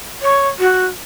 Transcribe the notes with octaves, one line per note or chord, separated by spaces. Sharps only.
C#5
F#4